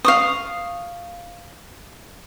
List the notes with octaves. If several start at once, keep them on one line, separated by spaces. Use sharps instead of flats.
F5 C#6 D#6